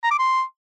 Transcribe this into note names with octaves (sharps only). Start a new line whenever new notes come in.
A#5
D6
C6